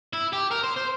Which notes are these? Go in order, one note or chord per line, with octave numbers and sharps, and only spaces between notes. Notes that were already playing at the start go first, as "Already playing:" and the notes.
E4
G4
A#4
C5
C5